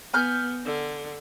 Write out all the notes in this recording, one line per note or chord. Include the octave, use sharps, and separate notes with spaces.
B3 G#5 F6 G6
D3